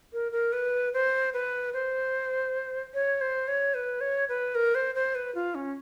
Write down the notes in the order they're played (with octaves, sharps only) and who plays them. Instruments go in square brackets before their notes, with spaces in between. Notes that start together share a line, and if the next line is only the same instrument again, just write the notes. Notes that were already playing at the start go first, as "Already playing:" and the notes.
[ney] A#4
A#4
B4
C5
B4
C5
C#5
C5
C#5
B4
C#5
B4
A#4
C5
C5
B4
F4
C#4